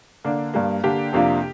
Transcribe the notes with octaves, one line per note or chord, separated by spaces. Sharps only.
D3 A#3 D4
G2 G3 A#3
D3 A#3 D4 G4
F2 C3 A#3 D4 F4